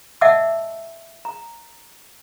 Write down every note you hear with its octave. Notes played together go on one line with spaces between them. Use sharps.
D#5 E5 F#5 A5 D6 E6
A#5